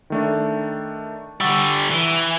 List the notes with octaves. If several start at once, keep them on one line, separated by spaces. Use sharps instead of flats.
D#3 A3 D4
D3 G3 F#5 C#6 E6
E3